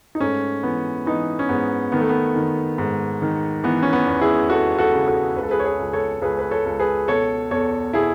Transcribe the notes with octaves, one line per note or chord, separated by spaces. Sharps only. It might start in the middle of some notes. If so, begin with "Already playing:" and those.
D#4
G#2 A3 C#4
E3 B3
E3 B3 D#4
C#4
G#2 B3
D#3 B3
A3
B3
D#3
G#2
D#3
E3 B3
C#4
B3
E2
E4 G#4
E2 F#4 A4
F#4 A4
C#3
F#4 A4
C#2 B4
A4
G#4 B4
C#5
G#4 B4
C#2
A4 C#5
C#2 G#4 B4
B4
A4 C#5
C#2
G#4 B4
B2 A4 C#5
E2 A4 C#5
B2 E4 G#4